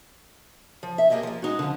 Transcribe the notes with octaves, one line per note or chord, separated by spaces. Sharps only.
F3
E5
A#3 B3 G4 G#4 D#5
F3 A#3
G#3 D#4 F#4
D3 F3